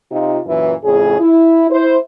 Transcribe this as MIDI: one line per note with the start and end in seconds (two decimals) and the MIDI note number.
0.11 0.39 48
0.11 0.39 63
0.11 0.39 65
0.46 0.74 42
0.46 0.74 46
0.46 0.74 52
0.83 1.18 41
0.83 1.18 45
0.83 1.18 49
0.83 1.18 68
1.20 1.67 64
1.70 1.97 64
1.70 1.97 72